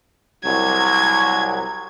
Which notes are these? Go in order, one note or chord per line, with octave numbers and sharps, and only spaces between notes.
C2 F#3 G#6